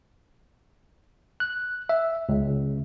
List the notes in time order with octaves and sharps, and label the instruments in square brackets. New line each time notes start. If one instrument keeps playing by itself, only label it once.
[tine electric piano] F#6
E5
C#2